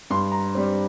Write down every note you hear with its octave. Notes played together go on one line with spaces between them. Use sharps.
G2 C6
A#5
G3 C4